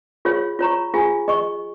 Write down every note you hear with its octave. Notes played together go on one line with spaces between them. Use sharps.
F4 G#4 C#5 F5
F4 C#5 A#5 C#6
F4 G#4 F5 G#5
G#4 D#5 C#6